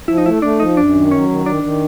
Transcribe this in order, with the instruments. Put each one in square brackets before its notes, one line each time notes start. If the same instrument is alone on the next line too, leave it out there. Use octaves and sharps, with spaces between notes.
[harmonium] F3 [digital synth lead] E4
[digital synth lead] D#4
[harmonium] A3 [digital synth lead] E4
[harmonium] A3 [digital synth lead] D4
[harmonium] F3 [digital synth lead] D#4
[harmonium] F#2 [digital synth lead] D4
[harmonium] D#3
[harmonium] F#3 [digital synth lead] C#4
[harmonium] D#3
[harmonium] D#3 [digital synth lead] D4
[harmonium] D#3